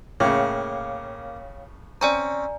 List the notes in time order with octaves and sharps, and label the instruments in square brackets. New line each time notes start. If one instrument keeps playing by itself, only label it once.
[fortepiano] A2 C#3 [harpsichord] A#3 [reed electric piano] C#5 F5 G5
[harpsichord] C4 C#4 [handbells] D5 G#5 A#5